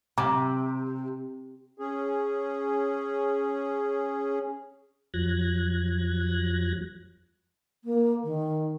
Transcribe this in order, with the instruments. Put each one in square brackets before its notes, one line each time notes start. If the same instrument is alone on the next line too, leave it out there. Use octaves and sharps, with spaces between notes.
[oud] C3 [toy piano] A#5 D6
[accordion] C#4 G#4
[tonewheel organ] F2 F3 F#3 F#6 G#6 A#6
[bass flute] A#3
D#3